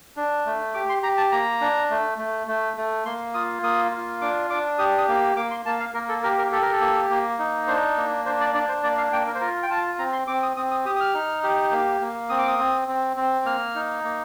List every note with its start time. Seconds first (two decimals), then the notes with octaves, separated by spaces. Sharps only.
0.17 D4
0.46 A3
0.74 G4 D6
0.89 C6
1.03 G4 A#5
1.17 A5
1.32 A#3 A#5
1.61 D4
1.90 A3
2.18 A3
2.47 A3
2.77 A3
3.05 A#3 C6
3.34 F4 D#6
3.63 A#3 D#6
3.92 F4
4.21 D4 D6
4.50 D4 D6
4.78 G4 D#6
4.98 D#6
5.08 A#3
5.36 A#3 D6
5.51 C6
5.66 A#3 A5
5.80 F5
5.94 A#3 A#4
6.09 A4
6.23 G4 A#4
6.38 A#4
6.52 G4 A4
6.62 A#4
6.72 A4
6.81 A#3
7.10 A#3
7.39 D#4
7.67 D4 C5
7.97 A#3
8.25 D4 C5
8.40 D5
8.54 D4 D5
8.69 C5
8.83 A#3 D5
8.97 F5
9.12 A#3 G5
9.27 A#4
9.35 C5
9.41 F4 A#4
9.63 G5
9.70 F4 A5
9.99 C4 A#5
10.13 C6
10.27 C4 D6
10.42 D#6
10.57 C4 D#6
10.71 D#6
10.85 G4 D#6
10.96 D#6
11.01 F6
11.14 D#4
11.43 G4
11.72 A#3
12.01 A#3
12.29 C4 D#6
12.38 D6
12.47 D#6
12.59 C4
12.88 C4
13.17 C4
13.45 A#3 F6
13.75 D#4
14.04 A#3